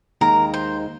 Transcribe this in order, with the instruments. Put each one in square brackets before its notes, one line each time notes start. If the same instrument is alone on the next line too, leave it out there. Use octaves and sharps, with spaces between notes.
[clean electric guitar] D#2 D#3 G#3 [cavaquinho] A#4
[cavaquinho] C5